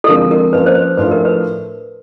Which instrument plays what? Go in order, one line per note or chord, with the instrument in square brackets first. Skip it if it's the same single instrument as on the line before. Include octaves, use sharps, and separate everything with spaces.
[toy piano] A4
[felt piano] D3 F3 G#3 C4 [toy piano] A#4
[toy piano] A#4
[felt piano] F3 A#3 C#4 [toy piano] B4
[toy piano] C5
B4
[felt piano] A2 F3 A3 D4 F4 [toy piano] B4
[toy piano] A#4
B4